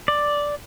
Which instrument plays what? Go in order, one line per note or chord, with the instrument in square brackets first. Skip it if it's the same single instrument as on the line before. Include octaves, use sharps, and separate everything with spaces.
[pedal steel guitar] D5